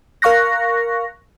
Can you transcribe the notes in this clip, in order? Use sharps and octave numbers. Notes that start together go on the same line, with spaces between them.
A#4 F5 C#6 F#6 A#6